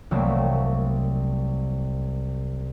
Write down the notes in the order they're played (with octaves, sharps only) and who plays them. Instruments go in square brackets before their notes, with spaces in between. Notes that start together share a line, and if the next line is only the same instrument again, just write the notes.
[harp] C2 F#3 A3 A#3